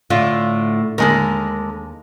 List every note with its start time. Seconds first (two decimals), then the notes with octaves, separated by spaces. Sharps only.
0.10 A2 D3 F4
0.98 D#2 D3 G#3 A#4